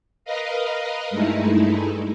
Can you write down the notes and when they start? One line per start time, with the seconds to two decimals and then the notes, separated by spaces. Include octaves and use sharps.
0.25 A#4 B4 D#5 F5
1.10 G2 G#3 A3 D#4 E4